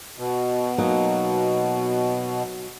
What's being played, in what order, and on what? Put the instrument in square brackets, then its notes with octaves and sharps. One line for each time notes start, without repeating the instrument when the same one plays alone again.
[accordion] B2
[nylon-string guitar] F#3 A#3 D#4